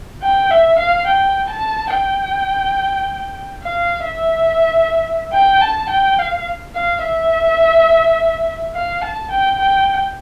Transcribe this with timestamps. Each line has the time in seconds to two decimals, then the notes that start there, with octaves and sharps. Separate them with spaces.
0.23 G5
0.51 E5
0.79 F5
1.07 G5
1.50 A5
1.93 G5
3.63 F5
4.05 E5
5.33 G5
5.61 A5
5.90 G5
6.19 F5
6.75 F5
7.04 E5
8.75 F5
9.02 A5
9.31 G5
9.59 G5